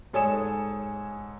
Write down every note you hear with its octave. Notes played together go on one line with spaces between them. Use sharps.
G#2 A4 C#5 G#5 D#6 E7